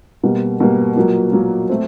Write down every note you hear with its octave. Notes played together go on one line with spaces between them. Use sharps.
B2 G3 A#3
B2 G3 A#3
A#2 F#3 A#3
A#2 F#3 A#3
A3 C4